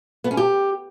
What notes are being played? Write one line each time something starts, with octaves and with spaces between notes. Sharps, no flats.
B3
C#4
G4